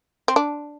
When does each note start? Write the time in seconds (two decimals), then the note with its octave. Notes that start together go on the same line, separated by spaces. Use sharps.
0.28 C4
0.36 D4